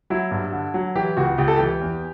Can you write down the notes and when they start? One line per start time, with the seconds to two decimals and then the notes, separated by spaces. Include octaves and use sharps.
0.10 F#3 E4
0.31 G2
0.52 D3
0.74 F#3
0.95 E3 G4
1.17 C#2 F#4
1.38 C#2 G4
1.48 A4
1.57 E3 G4
1.81 E2